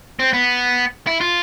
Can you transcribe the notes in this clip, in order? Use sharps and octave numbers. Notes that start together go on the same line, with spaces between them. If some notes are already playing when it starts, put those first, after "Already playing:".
C4
B3
E4
F4